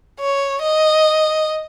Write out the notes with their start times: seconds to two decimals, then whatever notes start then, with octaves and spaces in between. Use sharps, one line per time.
0.20 C#5
0.62 D#5